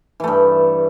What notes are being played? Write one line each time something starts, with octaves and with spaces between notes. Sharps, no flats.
G2 E3 A3